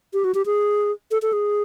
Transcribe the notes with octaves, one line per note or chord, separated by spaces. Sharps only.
G4
F#4
G4
G#4
A4
A4
G#4